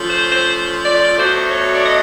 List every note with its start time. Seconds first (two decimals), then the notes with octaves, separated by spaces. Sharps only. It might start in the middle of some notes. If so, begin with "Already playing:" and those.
Already playing: F3 A3 C#4
0.08 C5
0.30 C5
0.84 D5
1.17 B2 F#3 A3 D4 C5
1.45 C5
1.51 C#5
1.73 D5
1.84 D#5